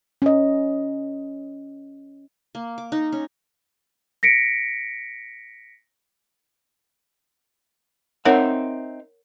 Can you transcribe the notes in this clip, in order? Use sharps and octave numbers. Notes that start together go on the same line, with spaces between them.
C#4 D#5
A#3
D6
D#4
C#4
A#6 B6 C#7 D7
C4 D#4 A#4 C#5 E5 F#5